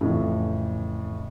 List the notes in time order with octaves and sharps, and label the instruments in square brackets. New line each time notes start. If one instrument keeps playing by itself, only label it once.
[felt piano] F2 A2 C#3 E3